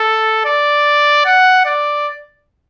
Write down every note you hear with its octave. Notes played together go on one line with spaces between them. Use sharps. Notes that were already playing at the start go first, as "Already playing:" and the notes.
Already playing: A4
D5
F#5
D5